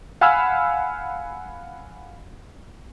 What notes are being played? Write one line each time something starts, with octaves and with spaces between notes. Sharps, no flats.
F5 F#5 G#5 B5 E6 F6